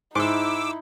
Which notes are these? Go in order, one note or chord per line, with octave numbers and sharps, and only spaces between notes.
G#2 D#4 E4 D6 E6